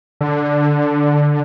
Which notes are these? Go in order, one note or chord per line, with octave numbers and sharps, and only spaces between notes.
D3